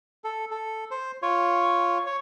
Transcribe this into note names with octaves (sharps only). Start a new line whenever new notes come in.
A4
A4
C5
F4 C#5
C#5